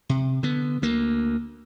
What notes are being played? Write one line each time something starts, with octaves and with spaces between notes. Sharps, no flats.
C3
D3 B3
D2 A#3